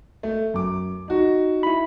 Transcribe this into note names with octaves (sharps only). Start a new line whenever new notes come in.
A3
F#2 D6
D#4 F#4
E4 B5